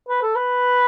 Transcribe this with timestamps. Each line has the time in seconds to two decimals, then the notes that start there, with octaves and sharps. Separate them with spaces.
0.08 B4
0.22 A4
0.35 B4